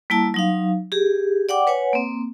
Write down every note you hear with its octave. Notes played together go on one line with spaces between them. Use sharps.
G3 A#3 E4 A5
F#3 D#4 F5
G4 G#4
D5 F#5 G5 D6
B4 C#5 F#5 G#5
A#3 C4